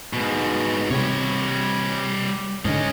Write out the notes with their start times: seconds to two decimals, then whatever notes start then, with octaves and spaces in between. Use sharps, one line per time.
0.13 G#2 B2
0.91 C3 G3 C#5
2.65 G#2 D3 C#4 D#5